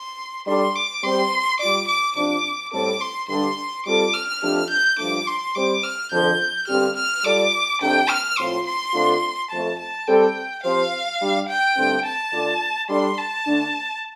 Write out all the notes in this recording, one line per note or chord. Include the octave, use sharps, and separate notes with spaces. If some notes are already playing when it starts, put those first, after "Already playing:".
Already playing: C6
G3 D4 A4 D5 C6
D6
G3 C4 G4 C5 C6
G3 F4 D5 D6
D6
C3 F3 D4 D6
A2 G3 C4 A4 D6
C6
G2 D3 G3 D4 C6
G3 C4 F4 A4 D6
F6
F2 F3 A3 D4 G4
G6
G2 F3 A3 D4 D6
C6
G3 C4 G4 C5 D6
F6
F2 D3 F3 G6
G2 D3 G3 C4 G4 F6
F6
G3 F4 A4 D5 D6
F2 C3 A3 D4 A4 G5
F6
A2 F3 C4 F4 C6
C6
D3 A3 C4 F4
F2 F3 A3 A5
A5
G3 C4 A4 G5
F3 C4 G4 C5 F5
G3 D4 G4
G5
G2 D3 A3 C4
A5
D3 A3 F4 D5
G3 D4 A4 D5 C6
A5
D3 A3 D4